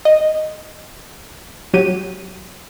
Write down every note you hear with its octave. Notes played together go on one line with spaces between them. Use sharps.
D#5
F#3 G4 D#7